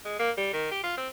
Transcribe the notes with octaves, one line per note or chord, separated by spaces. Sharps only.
G#3
A#3
G3
D#3
G4
F4
C4